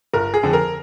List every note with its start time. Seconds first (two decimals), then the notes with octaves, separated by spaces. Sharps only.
0.13 G1 A#4
0.34 G#4
0.43 F2 D3
0.53 A#4